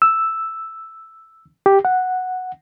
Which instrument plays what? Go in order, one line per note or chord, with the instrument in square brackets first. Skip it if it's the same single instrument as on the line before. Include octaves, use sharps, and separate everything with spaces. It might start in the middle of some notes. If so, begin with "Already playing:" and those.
[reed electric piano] E6
G4
F#5